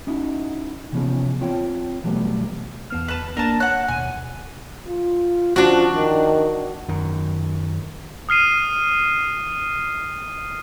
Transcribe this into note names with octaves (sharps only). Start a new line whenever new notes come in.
C#4 D#4 E4 F#4
C3 E3 F3 B3 C#4 G#4
C4 F4 C#5 G5
B2 E3 F#3 G3 A3 B3
E2 B3 F6
B4 A5
A#3 D4 A#4 A5
C#5 F#5 F#6
D#2 B2 G#5
F4
F3 D4 F#4
D#3
F#2 D#3
D#6 F6 C7 D#7